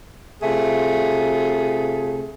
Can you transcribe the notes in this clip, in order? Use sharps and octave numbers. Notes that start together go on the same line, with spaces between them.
C3 A3 F4 G#4